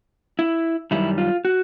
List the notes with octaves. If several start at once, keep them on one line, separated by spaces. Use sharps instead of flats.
E4
F#2 D#3 G3 E4
F4
F#4